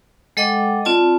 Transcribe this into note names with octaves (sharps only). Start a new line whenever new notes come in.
G#3 A4 D#5 F#5 G5 D6
C4 F4 D5 A5